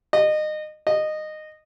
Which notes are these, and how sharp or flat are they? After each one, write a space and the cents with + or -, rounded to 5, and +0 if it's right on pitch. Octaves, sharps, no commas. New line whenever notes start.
D#5 -25
D#5 -15